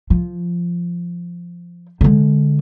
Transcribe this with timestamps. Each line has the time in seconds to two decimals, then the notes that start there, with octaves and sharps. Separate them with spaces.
0.10 F3
2.01 D3 G#3